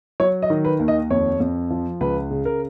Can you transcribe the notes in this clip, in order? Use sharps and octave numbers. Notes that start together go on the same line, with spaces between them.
F#3 C#5
D#5
D#3
B4
D#2
D#5
F2 C#5
F2
F3
C#2 B4
C#3
A#4